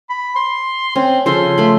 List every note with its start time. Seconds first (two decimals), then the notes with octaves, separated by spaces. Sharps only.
0.09 B5
0.36 C6
0.96 C4 C#4
1.26 C#3 F3 A4 C6
1.58 A3 B5